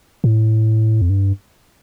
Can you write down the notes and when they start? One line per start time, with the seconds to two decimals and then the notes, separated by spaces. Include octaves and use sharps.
0.24 A2
1.02 F2
1.10 G2